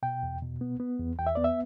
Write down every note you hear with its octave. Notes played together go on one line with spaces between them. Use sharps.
B2 G5
E2
B2
B3
B3
E2
E2 G5
E5
B3 D5
E5